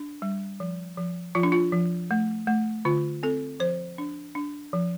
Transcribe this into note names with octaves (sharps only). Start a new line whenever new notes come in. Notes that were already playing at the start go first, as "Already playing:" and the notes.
Already playing: D4
G3
F3
F3
F3 F4
D4
F4
F3
A3
A3
D3 F4
C4 A4
F3 C5
D4
D4
F3